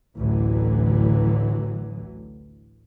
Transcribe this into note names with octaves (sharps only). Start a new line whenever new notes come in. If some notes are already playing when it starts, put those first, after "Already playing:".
A1 D2 D3 E3 F#3